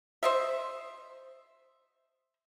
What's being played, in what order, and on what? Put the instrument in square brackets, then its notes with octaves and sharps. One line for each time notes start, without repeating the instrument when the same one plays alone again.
[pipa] C5 D#5 E5